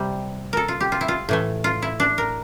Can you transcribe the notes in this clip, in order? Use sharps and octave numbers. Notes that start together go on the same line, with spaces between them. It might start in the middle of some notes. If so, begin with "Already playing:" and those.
Already playing: C3 G3
A4 A#4
F4
G4
F4
E4
F4
A2 E3 A3
F4
E4
D4
A#4